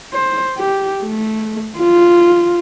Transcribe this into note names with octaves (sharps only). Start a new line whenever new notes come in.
C5
G4
A3
F4